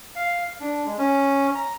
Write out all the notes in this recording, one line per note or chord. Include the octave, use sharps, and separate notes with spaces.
F5
D4
G#3
C#4
A#5